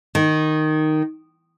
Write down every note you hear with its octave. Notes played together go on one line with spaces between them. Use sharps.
D#3